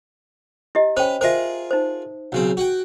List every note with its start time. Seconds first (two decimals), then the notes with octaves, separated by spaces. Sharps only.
0.75 E4 G4 D#5
0.97 C#4 B4 C5 G5
1.21 F4 G#4 A#4 C5 E5
1.71 D#4 C5
2.32 B1 C#3 C4
2.57 F#4 F#5 G5